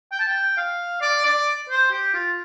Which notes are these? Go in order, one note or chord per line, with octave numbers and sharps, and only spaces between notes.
G5
A5
G5
F5
D5
D5
C5
G4
F4